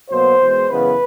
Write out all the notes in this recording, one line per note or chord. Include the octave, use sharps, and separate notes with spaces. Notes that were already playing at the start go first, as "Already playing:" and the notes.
B2 F#3 A#3 C5
E2 B2 G#3
F#2 C#3 E3 G#3 B3 B4